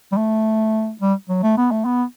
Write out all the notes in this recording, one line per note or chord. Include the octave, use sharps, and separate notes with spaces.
G3
A3
G3
F#3
A3
B3
A3
B3